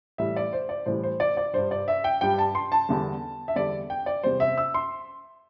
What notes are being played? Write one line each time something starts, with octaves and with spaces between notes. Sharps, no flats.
A2 E3 G3 E5
D5
C5
D5
A2 E3 G3 C5
C5
D5
D5
G2 G3 C5
D5
E5
G5
G2 G3 G5
A5
C6
A5
E2 D3 G3
E5
E2 D3 G3 D5
G5
D5
E2 C3 G3 C5
E5
E6
C6